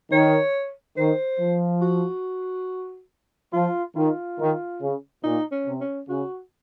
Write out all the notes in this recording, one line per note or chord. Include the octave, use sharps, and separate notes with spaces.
D#3 C#5
D#3 C5
F3
F#4
F3 F4
D#3 F4
D#3
C#3
A#2 D#4
C#4
C3
C#4
C#3 F#4